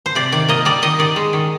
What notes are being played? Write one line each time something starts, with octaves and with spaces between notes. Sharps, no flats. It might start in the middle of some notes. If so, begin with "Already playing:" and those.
C5
C3 D5
D#3 D5
A#3 D#5
G3 D5
D#3 D#5
D#3 D5
G#3
D#3